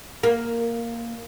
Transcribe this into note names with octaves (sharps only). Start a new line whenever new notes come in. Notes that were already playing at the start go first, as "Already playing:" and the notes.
A#3